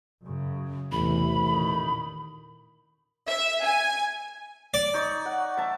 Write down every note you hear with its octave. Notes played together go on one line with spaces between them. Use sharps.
F#2 C#3
A1 E2 C3 B5
A#2 D#3
E5
G#5
D5
D#4 C#5 D#5
F#5
E5 A5